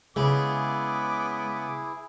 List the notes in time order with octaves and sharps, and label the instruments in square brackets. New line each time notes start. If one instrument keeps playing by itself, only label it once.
[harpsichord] C#3 [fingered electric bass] G#3 [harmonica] B3 D6 [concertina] E4 G#4